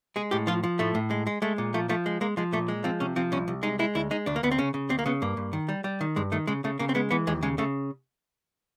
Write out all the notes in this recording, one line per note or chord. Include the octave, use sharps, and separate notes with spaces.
G#3 G#4
A2 G4
F3 F4
F3
A2 A3
A2
G#3
G#3
G#3 A3
A#2
F3 A3
F3 A3
G#3
G#3 A#3
F3 G#3
A#2 A3
G#3
F3 C4
C3 C#4
F3 C4
C2 C#4
C2
G#3 D#4
G#3 E4
D2 E4
G#3 D#4
D2 D4
A#3
D2 B3
C4
C#3 C#4
C#3
D2 C4
A#3
C#3 B3
G2 A#3
G2
D#3
G3
G3
D#3
G2 G#3
D#3 A3
C#3 G#3
C#3 A3
C#3 A#3
C4
G#3 B3
E3 B3
D#2 G#3
C#3 G#3
C#3 A3